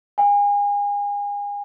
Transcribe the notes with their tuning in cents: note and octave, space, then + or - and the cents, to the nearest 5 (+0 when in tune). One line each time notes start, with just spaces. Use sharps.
G#5 -35